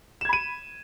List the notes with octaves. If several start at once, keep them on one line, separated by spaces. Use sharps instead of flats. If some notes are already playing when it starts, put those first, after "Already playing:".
B5 G#6 D#7 E7